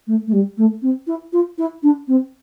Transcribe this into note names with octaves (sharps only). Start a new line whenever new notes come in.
A3
A3
G3
A3
C4
E4
F4
E4
D4
C4